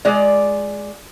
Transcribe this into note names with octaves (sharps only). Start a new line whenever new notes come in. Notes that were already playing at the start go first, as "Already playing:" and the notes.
G#3 F4 D5